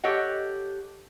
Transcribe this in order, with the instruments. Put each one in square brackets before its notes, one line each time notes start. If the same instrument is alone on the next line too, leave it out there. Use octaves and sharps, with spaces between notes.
[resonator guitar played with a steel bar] G4 A4 C#5 D#5 F#5